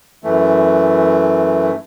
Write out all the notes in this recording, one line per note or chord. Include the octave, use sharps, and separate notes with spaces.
F#2 E3 A3